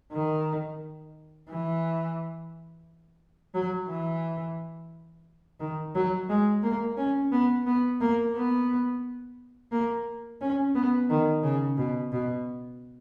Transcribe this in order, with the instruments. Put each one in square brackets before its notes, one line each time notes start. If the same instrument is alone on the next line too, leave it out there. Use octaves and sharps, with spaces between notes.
[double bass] D#3
E3
F#3
E3
D#3
F#3
G#3
A#3
C#4
B3
B3
A#3
B3
A#3
C#4
B3
D#3
C#3
B2
B2